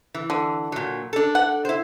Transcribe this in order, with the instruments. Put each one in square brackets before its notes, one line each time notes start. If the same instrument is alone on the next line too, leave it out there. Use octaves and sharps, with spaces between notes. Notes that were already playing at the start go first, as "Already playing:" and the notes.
[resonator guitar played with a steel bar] E3
[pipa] D3
[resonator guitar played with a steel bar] A#2 F#3
D4 A4
[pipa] F#5
[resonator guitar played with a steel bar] E4 C5